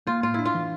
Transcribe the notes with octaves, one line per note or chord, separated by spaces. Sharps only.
A#3 F4
A2 F4
D4 E4
F4
E3